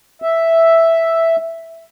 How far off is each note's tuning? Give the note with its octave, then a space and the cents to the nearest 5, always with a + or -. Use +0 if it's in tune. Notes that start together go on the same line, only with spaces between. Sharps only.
E5 +0